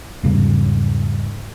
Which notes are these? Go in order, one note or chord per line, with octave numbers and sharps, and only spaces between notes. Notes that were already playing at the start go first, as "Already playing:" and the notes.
E2 G#2 C#3 G3